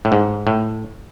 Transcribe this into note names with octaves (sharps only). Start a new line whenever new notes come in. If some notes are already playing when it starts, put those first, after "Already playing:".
A2
G#2
A2